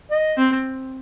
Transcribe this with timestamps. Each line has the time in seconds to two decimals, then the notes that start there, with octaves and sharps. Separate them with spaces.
0.11 D#5
0.37 C4